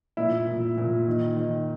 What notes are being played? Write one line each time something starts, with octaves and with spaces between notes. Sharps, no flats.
A#2 E4
A#2
A#2
D#3
D#3